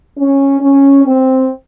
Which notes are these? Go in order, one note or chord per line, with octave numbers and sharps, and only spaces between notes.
C#4
C#4
C4